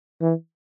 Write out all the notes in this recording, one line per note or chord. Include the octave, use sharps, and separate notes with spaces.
E3